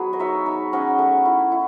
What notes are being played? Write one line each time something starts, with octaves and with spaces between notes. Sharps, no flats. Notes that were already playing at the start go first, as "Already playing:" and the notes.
Already playing: F#3 B3 G#4
D#5
D#4 C#5 E5
D#4
C#4 D#5 F#5
A3
E4
E4